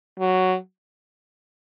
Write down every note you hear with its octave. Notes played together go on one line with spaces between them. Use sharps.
F#3